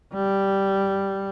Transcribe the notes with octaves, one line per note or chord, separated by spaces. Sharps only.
G3